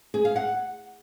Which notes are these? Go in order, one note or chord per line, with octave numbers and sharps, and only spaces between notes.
G#4
F5
F#5